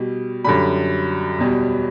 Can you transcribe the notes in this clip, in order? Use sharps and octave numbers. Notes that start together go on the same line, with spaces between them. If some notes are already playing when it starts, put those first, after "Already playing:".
Already playing: B2 G3
F#2 D3 G3 B5
E2 B2 G3